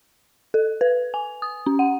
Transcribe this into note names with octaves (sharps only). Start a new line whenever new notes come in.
A4
B4
G#5
D#6
C#4
F#5